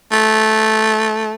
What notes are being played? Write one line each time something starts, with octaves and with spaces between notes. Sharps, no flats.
A3